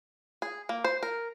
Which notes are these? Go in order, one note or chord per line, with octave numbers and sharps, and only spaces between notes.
G#4
A#3
C5
A#4